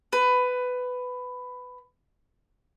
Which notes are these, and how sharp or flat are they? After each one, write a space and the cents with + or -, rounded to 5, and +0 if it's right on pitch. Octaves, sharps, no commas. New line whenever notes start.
B4 +15